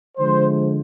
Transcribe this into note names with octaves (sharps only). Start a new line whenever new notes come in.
D3 F3 G#3 C5